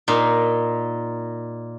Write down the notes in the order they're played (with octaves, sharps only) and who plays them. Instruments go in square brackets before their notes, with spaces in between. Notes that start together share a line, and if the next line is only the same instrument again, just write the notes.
[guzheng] A#2 D#4